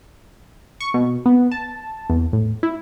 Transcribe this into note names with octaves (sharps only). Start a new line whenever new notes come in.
C#6
B2
B3
A5
E2
A2
E4